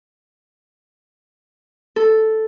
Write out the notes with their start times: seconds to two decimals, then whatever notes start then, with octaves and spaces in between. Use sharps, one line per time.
1.96 A4